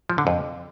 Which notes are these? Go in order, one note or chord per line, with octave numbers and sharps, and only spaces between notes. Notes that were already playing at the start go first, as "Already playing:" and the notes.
F3
D3
F2